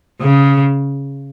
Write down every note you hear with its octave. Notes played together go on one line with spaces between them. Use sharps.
C#3